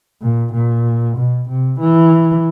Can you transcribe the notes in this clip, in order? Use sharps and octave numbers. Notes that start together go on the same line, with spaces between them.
A#2
A#2
B2
C3
E3